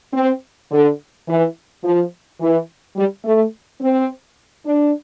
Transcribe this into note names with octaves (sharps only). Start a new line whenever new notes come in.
C4
D3
E3
F3
E3
G3
A3
C4
D4